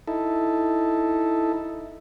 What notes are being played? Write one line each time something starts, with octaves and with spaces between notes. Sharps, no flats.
D#4 E4 A4